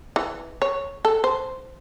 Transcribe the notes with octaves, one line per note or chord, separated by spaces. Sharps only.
E3
C#5
A4
C5